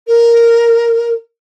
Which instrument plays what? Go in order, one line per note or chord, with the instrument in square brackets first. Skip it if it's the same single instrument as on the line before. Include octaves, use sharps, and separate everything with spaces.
[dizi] A#4